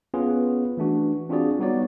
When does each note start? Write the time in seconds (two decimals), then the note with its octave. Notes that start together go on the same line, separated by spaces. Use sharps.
0.14 B3 C#4 F4 G#4 B4
0.77 E3 A3 D4 F#4
1.29 C4 D4 F4 F#4 G#4 D5
1.59 G3 B3 D#4 F#4 C#5 D5